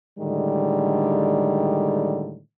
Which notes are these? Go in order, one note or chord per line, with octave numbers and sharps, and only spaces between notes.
A2 D3 D#3 G3 G#3